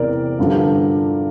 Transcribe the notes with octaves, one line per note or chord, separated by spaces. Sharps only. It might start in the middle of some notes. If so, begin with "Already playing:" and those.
Already playing: E2 C3 A#4 D5
G2 D3 F3